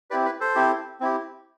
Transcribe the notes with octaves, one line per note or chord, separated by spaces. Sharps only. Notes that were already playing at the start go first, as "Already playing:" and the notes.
C4 E4 G4 B4 D5
B4
A4 C5
C4 E4 G4
C4 E4 G4